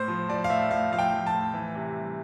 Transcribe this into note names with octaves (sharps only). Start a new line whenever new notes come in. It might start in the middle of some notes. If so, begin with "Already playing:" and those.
Already playing: A2 C5
F3
F3 D5
F5
A2 E5
A2 F5
F3 F5
G5
F3
A5
A2
E3
C3
G3